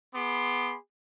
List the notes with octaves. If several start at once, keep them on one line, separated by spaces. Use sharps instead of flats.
B3 G#4 B5 C6 D6